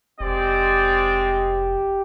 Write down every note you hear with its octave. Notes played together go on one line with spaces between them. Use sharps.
F1 G#3 C4 G4 D5